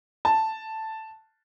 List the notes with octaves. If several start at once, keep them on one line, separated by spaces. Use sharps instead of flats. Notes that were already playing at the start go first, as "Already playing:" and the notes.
A5